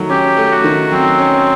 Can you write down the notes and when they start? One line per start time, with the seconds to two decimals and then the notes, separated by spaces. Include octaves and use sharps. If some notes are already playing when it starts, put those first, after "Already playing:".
Already playing: D#3 F#3 A3
0.09 C#4 G4
0.37 A3
0.51 F#4
0.64 D#3
0.92 F#3 C4
1.19 C#4